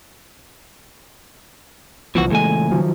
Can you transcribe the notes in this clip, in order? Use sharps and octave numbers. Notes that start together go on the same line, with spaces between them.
C2 B2 E3 F3 F#4
C#2 A#2 E3 G#3 A3 G#5
D#3 F3 F#3